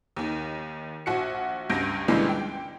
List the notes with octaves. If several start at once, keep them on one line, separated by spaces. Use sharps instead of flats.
D#2 D#3
A#1 F#4 C#7
C#2 G2 G6 A#6 D7
C#2 A#2 D3 E3 G3 G#3
G5